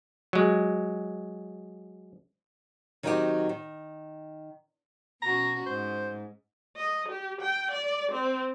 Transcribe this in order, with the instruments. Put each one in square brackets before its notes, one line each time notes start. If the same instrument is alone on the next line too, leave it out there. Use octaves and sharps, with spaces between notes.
[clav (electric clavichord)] F#3 G#3
[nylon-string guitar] D#3 F#3 C4 D#4 F#4 G4
D#3
[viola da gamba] B2 C#4 F#4 [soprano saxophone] A#5
[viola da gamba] G#2 [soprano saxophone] C5
[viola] D#5
G4
G5
D5
C4